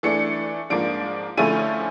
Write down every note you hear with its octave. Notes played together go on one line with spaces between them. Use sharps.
E3 A3 D4 C#7
G#2 F3 A#3 D4 D7
D3 F3 A3 C#4 E4 D#7